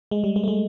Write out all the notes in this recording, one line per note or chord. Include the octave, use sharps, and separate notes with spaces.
G#3
G3
G#3
A3
G#3